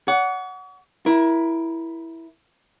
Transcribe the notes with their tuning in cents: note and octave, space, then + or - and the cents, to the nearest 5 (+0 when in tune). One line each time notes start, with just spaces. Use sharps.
C#5 +45 F#5 +0
E4 +0 A#4 +25